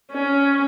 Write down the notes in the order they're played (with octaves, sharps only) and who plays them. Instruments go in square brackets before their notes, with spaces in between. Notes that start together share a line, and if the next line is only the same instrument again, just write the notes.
[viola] C#4